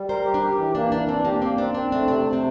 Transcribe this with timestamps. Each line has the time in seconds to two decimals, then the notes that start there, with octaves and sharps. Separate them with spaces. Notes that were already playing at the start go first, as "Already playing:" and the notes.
Already playing: G3
0.09 A#4 C5
0.25 G4
0.34 D4
0.42 G4
0.58 E3
0.75 A#3 D4
0.92 E3 D4
1.09 C4 D4
1.25 A#3 G4
1.42 A#3 C4
1.58 C4 D4
1.75 C4 D4
1.92 A3 D4
2.08 C3 D4
2.26 C3
2.33 C4